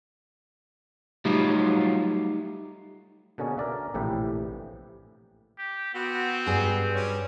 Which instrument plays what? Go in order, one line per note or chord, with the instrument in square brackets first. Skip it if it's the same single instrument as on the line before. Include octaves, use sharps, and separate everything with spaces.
[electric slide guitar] F#3 G3 F4 [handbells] A3 D#4 G4
[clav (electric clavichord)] B2 D3 A#3 C#4 G#4
A#4 D5 E5
A#1 A2 C3 E3 G4 B4
[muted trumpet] G4
[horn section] B3 F#4 [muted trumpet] C4
[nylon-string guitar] G2 G#4
[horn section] G3 C#4